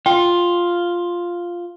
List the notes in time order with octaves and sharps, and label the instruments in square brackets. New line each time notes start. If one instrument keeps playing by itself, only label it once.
[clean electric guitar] F4 [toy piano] G5